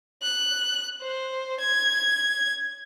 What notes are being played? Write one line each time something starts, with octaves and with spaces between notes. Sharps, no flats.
F#6
C5
G#6